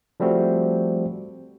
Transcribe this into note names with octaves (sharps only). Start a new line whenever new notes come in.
F3 G3 A3 C4 F#4